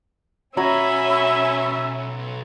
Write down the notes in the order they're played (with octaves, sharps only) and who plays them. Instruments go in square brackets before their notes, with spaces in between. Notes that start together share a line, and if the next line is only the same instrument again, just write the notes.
[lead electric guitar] B1 B5 [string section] C#4 [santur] F#4 C#5 A#5 [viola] E5